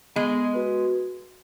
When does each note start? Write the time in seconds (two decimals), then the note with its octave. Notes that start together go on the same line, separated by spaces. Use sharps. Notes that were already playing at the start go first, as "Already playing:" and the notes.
0.16 G#3 B3
0.54 F#4 B4